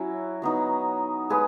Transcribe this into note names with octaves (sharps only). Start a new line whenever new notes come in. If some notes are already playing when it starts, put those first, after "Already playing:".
Already playing: F#3 C#4 E4 F#4 E5
F#3 B3 D#4
G#3 G#4 B4